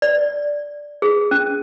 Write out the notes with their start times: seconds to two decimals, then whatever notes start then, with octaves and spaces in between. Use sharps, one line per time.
0.02 D5
1.02 G#4
1.31 C#4